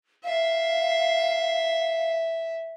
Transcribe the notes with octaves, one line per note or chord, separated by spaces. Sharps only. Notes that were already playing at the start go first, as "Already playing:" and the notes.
E5 F5